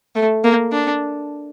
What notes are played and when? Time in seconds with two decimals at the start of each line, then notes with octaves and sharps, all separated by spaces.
0.16 A3
0.44 A#3
0.72 D4